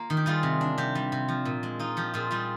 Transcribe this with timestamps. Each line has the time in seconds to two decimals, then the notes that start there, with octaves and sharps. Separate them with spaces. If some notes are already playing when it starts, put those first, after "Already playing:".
Already playing: A#3 F4 A#4
0.10 D#3
0.17 G4
0.26 G3 F4 G#4
0.43 C3
0.61 D4
0.78 C3 G4
0.95 G3
1.12 C3
1.28 F3
1.45 A#2
1.63 G#3
1.79 D#4 F4
1.97 F3 G4
2.14 A#2 F4 G#4
2.31 G3 F4 G#4